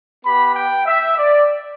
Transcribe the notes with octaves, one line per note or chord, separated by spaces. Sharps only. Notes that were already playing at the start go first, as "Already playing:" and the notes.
B3 G4 B5
G5
E5
D5